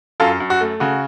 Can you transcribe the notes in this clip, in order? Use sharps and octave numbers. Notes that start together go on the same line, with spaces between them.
F#2 F4 A4
F#2
F#4
A3
C#3 F#4